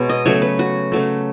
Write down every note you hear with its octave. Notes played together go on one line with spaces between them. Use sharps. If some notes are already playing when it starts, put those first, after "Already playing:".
Already playing: B2 G#3 B3 C#5
D#5
C#3 F#3 A3 C#5
B4
F#4
C#3 F#3 A3